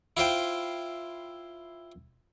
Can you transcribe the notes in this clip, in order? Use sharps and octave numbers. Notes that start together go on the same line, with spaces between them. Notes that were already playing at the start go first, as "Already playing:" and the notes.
E4 F4 C5 G5